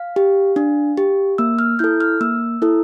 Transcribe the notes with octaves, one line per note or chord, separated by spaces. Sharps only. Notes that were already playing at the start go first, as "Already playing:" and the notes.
Already playing: F5
G4
D4
G4
A#3 E6
F6
E4 A4 G6
F6
A#3 E6
E4 A4